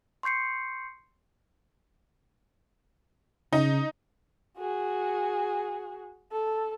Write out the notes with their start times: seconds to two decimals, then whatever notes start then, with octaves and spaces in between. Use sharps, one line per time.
0.23 C6 C#6 G6 C7 C#7
3.53 C#3 D#4
4.58 F#4 G#4
6.32 A4